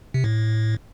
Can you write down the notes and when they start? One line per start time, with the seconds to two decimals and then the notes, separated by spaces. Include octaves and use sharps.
0.14 C3
0.24 A2